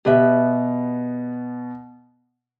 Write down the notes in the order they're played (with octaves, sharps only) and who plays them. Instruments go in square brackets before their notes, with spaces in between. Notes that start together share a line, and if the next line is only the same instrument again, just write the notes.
[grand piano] B2 B3 [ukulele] G4 B4 E5